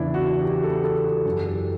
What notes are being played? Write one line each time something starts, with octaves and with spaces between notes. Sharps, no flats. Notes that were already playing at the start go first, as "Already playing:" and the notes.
Already playing: E2 C#3 E3 D4 E4
F#4
G4
A4
A4
F#4
F#2 E3 G4
A4